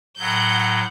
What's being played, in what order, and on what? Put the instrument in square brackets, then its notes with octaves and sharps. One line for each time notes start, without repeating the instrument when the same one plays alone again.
[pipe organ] A2 F#3 [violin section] F#5 G6